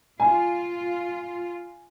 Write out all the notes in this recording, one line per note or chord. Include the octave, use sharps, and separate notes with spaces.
F4 G#5